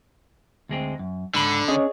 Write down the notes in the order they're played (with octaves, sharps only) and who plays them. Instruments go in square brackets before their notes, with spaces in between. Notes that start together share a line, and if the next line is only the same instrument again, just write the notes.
[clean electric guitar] D2 G#3 C4
F#2
[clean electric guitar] C#2 G#2 B5 [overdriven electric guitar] D3
[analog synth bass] C#4 [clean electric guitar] G#4 [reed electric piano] C#5 D#5